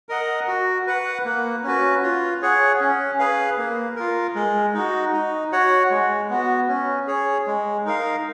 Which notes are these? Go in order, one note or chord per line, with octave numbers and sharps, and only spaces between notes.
A#4 D#5 F#5
F#4
B4 F#5
A#3
C#4 F#4 B4
F4
G#4 C#5 F#5
C#4
G#4 B4 F5
A#3
F4 A#4
G#3
D#4 F#4
D#4
F#4 C#5 F#5
G#3
B3 F#4
C#4
G#4 C#5
G#3
D#4 A#4 F5